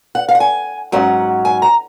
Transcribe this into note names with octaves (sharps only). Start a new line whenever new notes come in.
F#5
F5
F#5
G#5
G#2 F#3 C#4 F#5
G#5
A#5